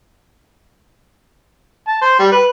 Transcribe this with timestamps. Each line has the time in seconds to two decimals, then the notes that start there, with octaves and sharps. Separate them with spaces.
1.88 A5
2.02 C5
2.19 G3
2.32 B4